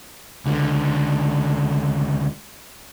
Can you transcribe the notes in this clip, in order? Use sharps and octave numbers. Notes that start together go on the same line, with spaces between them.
C#2 D3